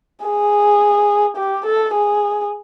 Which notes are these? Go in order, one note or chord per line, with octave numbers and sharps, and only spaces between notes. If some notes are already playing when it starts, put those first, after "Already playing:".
G#4
G4
A4
G#4